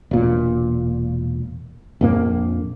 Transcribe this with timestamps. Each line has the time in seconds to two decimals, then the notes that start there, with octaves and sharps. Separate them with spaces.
0.11 E1 A#2
2.01 A#1 F2 A#3